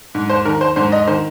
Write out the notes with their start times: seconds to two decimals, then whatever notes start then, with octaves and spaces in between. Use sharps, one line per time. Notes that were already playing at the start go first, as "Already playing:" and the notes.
0.15 G#2
0.30 C5
0.45 D#3 A#4
0.61 C5
0.76 G#2 C5
0.92 D#5
1.07 D#3 C5